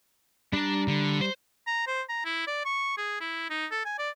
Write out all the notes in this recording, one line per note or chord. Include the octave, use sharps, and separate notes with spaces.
G3 D4 A#5
D3
C5
A#5
C5
A#5
E4
D5
C#6
G#4
E4
D#4
A4
G#5
D5